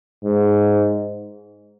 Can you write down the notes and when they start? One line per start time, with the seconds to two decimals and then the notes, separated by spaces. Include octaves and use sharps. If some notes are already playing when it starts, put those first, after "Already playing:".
0.24 G#2